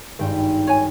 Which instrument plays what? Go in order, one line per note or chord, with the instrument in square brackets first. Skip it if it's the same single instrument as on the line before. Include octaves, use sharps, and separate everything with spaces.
[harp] G#1 G2 G5
[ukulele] C#5 G#5